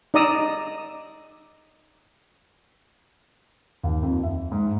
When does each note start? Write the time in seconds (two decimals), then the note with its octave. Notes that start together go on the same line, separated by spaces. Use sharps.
0.14 D#4 D5 A#5 D#6 E6
3.83 D#2
4.03 F2
4.23 E5
4.52 G#2